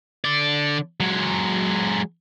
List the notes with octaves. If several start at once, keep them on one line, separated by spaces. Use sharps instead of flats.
D3 D5
F#3 G#3